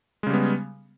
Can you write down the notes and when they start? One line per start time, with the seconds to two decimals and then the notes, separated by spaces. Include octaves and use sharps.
0.23 G#3
0.27 C#3
0.30 G3
0.34 B3